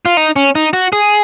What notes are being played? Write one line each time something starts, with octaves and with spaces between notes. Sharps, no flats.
F4
D#4
C#4
D#4
F#4
G#4